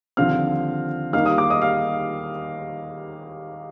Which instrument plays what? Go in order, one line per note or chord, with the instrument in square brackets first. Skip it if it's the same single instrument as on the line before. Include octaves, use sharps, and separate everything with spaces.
[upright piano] D#2 D3 F3 C4 F5 F6
D#2 D#3 G3 A#3 D#4 F5 F6
D#5 D#6
D6
D#5 D#6
F5 F6